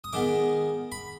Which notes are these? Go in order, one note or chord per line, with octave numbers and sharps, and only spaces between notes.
D#6
D#3 G#3 B3 D6
B5